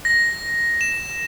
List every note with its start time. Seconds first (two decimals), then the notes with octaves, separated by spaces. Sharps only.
0.05 A#6
0.81 E7